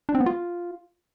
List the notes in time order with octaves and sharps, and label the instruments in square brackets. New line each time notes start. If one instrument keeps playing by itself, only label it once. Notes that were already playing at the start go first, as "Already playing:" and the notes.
[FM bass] D4
C4
B3
F4